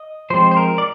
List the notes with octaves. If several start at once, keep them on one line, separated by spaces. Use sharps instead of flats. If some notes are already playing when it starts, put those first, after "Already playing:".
Already playing: D#5
F3 G#3 C4 C5
C5
A#4
D5